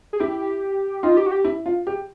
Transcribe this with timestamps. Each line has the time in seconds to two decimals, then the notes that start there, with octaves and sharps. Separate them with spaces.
0.13 G#4
0.20 E4 G4
1.03 D#4 F4
1.17 G4
1.26 F#4
1.31 G4
1.44 E4
1.66 F4
1.87 G4